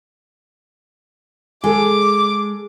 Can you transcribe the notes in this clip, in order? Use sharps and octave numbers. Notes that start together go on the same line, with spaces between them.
G#3 A4 G#5 D6